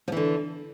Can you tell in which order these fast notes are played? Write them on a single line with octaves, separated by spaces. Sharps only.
F3 E3 D3